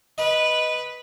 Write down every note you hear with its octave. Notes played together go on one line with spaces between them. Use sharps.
B4 D#5